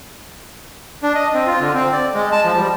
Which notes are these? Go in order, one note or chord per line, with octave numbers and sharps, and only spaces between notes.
D4
D#5
C4
F4
D3
C4
D5
G#3
A5
F3
G3